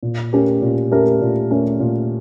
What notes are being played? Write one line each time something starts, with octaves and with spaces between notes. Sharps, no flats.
A#2
A3 C#4 G4 A#4
A#2
A3 C#4 G4 A#4
A#2
A3 C#4 G4 A#4
A#2